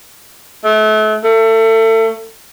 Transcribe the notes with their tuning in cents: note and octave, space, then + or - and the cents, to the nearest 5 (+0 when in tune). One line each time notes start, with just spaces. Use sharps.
A3 -35
A3 +30